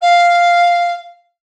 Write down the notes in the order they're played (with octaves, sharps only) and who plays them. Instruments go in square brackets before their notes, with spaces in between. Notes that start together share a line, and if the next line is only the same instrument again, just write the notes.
[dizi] F5